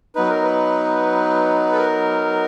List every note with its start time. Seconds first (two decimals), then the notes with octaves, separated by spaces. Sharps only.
0.15 F#3 B3 D#4 B4
0.29 A#4
0.44 B4
1.72 A4
1.78 A#4